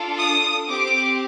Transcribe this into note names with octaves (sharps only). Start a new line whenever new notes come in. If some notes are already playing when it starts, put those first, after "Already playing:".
Already playing: D4 F4 A4
D#6
C4 G4 D6